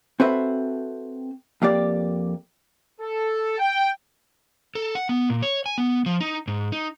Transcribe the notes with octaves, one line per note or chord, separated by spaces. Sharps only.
C4 F#4 A4 B4 C5 E5
F2 A#3 G4 D5
A4
G5
A4
F#5
B3
A#2
C#5
G#5
B3
F3
D#4
G#2
D#4